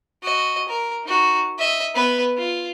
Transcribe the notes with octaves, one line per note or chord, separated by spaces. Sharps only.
F#4 D#5
A#4
D#4 F#4
D#5 E5
B3 B4
F4